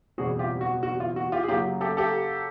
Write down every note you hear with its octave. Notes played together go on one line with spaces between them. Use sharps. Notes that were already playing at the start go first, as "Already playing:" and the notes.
F#1 E2 B2 G3 C4 F#4 G#4
F4 G4
F#4
F#4
F4
F#4
F4 G4
G#4
F#2 C#3 F#3 A#3 F4 G4
G4 A4
G4 A4